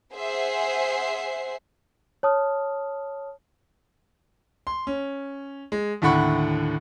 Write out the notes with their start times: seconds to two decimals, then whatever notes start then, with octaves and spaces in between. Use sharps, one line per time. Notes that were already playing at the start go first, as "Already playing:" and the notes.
0.15 G#4 C5 E5 F#5 C7
2.23 C#5 A5 D#6 F6
4.67 C6
4.87 C#4
5.72 G#3
6.02 D#2 A2 D3 F#5 B5 C#6